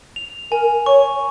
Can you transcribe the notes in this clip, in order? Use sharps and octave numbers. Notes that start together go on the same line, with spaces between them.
F7
A#4 G#5
C#5 C#6